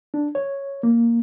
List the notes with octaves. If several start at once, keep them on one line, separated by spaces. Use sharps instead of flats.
D4
C#5
A#3